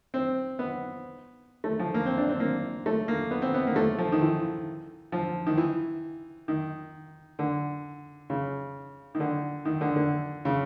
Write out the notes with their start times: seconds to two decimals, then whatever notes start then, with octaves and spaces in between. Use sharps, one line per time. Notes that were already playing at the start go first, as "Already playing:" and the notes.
0.14 C4
0.59 B3
1.64 A3
1.79 F3
1.94 A#3
2.06 C4
2.18 D4
2.29 C4
2.40 A#3
2.86 A3
3.08 A#3
3.31 B3
3.42 C4
3.54 B3
3.67 A#3
3.76 A3
3.98 F3
4.12 D#3
4.22 E3
5.12 F3
5.47 D#3
5.57 E3
6.48 D#3
7.39 D3
8.30 C#3
9.15 D#3
9.20 D3
9.65 D#3
9.81 D3
9.96 D3
10.45 C#3